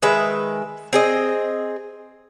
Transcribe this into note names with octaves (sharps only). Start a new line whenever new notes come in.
D#3 G#3 B4 E5
C4 G#4 D#5